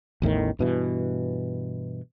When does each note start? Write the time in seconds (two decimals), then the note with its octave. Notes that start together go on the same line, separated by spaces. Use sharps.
0.22 A1 E2 A2 D#3
0.59 G2 B2 E3